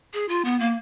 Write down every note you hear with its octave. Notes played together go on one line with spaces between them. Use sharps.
G#4
F4
B3
A#3